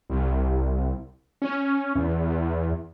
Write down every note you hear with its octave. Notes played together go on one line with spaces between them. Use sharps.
C2
C#4
E2